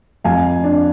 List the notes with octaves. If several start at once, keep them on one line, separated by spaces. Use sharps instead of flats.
F2 F5 G#5
D4